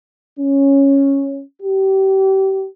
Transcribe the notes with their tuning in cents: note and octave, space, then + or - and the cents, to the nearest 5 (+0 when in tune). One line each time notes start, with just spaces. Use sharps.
C#4 -5
G4 -30